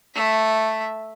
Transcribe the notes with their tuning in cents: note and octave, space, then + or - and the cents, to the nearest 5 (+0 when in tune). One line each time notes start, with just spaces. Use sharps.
A3 +0 E5 +0